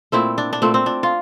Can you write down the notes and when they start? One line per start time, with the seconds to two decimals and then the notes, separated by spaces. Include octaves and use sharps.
0.12 A#2 A3 C4 E4
0.38 D4
0.53 D4
0.62 A#2 A3 C4
0.74 C4
0.86 D4
1.03 F4